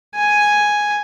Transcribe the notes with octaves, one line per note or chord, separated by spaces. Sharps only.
G#5